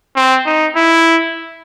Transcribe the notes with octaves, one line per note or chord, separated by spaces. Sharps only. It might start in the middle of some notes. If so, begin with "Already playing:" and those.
C4
D#4
E4